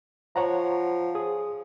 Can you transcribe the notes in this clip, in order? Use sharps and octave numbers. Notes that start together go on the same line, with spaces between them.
F3 C#5 F#5 A#5
G#4 D#6